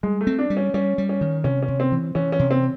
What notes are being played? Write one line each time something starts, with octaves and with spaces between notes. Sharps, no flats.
G3 G#3
A3
C4
D4
G3
C#4
G3 C#4
G3
C#4
D#3
C3 C#4
C#4
C3
C4
E3
E3 C#4
C#4
C3
C4